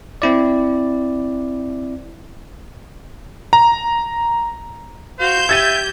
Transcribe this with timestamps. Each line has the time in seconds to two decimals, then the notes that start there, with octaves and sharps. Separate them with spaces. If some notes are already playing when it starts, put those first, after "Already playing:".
0.22 C4 E4 D5
3.53 A#5
5.19 F#4 C5 F5 G6
5.49 G4 E5 G#6 A6 D#7